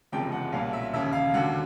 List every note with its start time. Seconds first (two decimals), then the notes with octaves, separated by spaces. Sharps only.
0.12 F#1 E2 C3 F3 G#3 G5
0.32 F#5
0.52 B1 A#2 G3 F5
0.73 E5
0.93 E1 D#2 C#3 E5
1.13 F5
1.33 D#2 D3 F#3 F#5